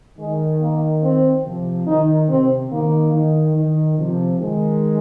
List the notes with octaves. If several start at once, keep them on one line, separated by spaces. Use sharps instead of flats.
D#3 G#3
A#3
C4
C3 F3
D#3 D#4
C3 C4
D#3 A#3
D#3
D#3
C3 F3
D#3 G#3